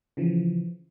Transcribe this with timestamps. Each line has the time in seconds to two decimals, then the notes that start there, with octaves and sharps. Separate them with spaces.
0.17 C#3 E3 F3